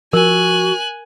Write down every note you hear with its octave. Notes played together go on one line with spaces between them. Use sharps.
F3 F#4 A#4 G#5 F#6